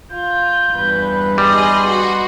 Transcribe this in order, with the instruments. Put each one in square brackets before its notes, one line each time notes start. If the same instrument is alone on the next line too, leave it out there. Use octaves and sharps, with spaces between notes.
[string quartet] F4 [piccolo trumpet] G6
[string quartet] E2 G2 B4
[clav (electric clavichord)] G3 [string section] G#4 D#5 [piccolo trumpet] C6
[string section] F#4